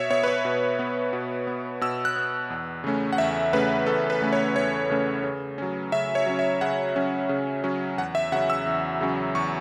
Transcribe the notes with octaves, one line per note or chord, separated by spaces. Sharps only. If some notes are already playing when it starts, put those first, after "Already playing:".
Already playing: B2 C#5 E5
B3 C#5
B4
C#5
B2
B3
B2
B3
B2 E6
F#6
B3
E2
C#3 A3 C#4
F#5
E2 E5
C#3 A3 C#4 B4
E2 A4
B4
C#3 A3 C#4
C#5
E2 C#5
C#3 A3 C#4
C#3
F#3 C#4
C#3 E5
C#5
F#3 C#4
E5
C#3 F#5
F#3 C#4
C#3
F#3 C#4
E2 F#5
E5
C#3 F#3 C#4 F#5
E6
E2
C#3 F#3 C#4
E2 C#6